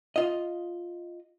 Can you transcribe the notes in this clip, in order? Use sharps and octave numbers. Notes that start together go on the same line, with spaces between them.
F4 D#5